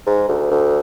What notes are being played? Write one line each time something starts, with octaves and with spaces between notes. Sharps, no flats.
G#2
D2
D2